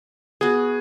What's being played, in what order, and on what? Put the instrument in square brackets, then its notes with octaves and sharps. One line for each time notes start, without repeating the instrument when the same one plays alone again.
[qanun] B3 F#4 [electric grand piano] G#4